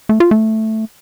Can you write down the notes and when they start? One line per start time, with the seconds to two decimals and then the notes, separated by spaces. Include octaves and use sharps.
0.09 A3
0.20 F4
0.31 A3